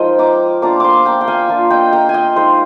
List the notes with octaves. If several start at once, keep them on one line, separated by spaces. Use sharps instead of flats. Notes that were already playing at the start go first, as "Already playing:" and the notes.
Already playing: F3 G#3 D#4 F4 A#4 D#5 G5
A#5 D6
A#3 D4 F4 A#5 D6
G#5 C6 D6
G5 A#5
G5
F5 G#5
A#3 D4 F4
D#5 G5
G5 A#5
G#5
D#5 G5
G#3 D#4 C5 D#5